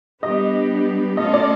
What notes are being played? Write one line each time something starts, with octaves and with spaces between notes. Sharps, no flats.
G3 B3 D4 G4 B4 D#5
A3 C#4 F4 A4 D#5
D5